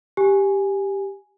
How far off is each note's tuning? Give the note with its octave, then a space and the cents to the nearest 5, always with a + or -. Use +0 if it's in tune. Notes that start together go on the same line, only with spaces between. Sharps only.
G4 +0 G#5 +0